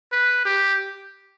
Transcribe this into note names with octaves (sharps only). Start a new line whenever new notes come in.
B4
G4